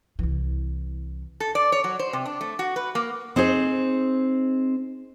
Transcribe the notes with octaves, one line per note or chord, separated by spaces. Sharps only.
C2 E3
A4
D5
C#5
F#3
C5
C3
D4
A3
F#4
B4
A#3
C4 D#4 G#4 C5